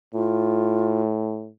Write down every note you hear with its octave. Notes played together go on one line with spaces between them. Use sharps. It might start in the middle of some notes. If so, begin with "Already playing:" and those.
A2 F4